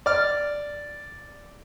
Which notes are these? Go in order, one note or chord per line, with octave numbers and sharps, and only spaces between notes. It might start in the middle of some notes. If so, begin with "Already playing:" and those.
D5 F6